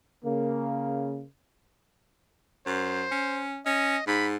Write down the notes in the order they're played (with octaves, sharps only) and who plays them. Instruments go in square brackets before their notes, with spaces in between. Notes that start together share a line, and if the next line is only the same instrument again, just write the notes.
[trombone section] C#3 A#3
[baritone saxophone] F#2 [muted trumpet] C5
[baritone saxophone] C#4
[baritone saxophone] C#4 [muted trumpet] D#5
[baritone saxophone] G#2 [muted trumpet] B5